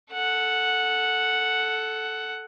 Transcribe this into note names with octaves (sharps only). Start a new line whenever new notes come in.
A4 F#5